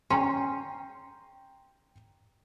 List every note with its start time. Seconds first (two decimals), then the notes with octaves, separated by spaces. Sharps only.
0.10 C#4 G5 A#5 C6